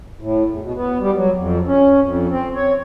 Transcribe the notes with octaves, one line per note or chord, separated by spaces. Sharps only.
A2
E2
B2
B3
G3
F#3
F2
C#4
F2
C4
C#5